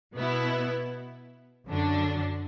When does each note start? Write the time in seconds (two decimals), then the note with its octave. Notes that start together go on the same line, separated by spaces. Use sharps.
0.15 B2 B3 E4
1.67 F#2 D3 F#3 D4